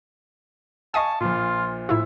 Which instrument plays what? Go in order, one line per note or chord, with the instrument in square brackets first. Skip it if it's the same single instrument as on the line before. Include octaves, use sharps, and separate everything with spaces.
[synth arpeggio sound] D#5 F5 D#6 [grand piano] G#5 C#6 [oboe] A5
[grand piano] A#1 A#2 [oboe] F4
[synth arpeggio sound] A2 E4 F4 [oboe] E5